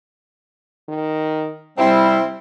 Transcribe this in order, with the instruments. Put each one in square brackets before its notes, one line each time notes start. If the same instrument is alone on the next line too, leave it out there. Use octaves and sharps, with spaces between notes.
[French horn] D#3
[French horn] C3 [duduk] G3 [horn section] C4 [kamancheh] E4